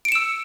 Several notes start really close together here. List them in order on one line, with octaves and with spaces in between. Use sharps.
D7 C#7 E7 E6